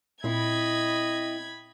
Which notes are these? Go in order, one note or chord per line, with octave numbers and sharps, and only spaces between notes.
A#2 C4 E4 D#5 B5 G#6